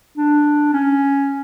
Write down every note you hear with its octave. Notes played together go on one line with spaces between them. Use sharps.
D4
C#4